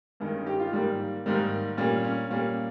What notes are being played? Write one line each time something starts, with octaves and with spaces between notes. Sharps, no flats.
G2 D#3 G#3
C#4
G4
F4
G#2 D#3 G3 A#3 G4
G#2 D#3 G3 A#3
A#2 G3 A#3 C#4
C#4
A#2 G3 A#3 C#4